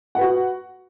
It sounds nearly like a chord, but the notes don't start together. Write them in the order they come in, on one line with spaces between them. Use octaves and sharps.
F#5 B4 F#4